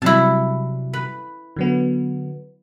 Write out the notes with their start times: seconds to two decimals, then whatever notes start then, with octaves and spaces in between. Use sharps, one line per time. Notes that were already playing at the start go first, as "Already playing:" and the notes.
0.02 C3 F#3 G3 E4 A5
0.93 B4
1.56 D3 F#3 B3